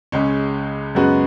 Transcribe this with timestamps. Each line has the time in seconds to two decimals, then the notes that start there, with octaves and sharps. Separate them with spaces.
0.12 C#2 C#3 G#3 C#4
0.95 F#2 C#3 G#3 B3 F#4